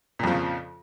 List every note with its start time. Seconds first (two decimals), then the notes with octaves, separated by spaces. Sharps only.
0.19 A#2
0.23 F2
0.27 F3
0.31 C#3